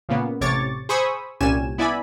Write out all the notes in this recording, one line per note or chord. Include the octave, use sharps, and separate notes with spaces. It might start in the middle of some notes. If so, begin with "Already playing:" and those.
A#2 C#3 A#3 B3
A1 C3 C#5 C#6 D6 A6
G#4 C5 B5 C#6 D#6 E6
C2 A#2 G3 C#4 G#5 E7
B3 E4 D5 E5 G#5 B5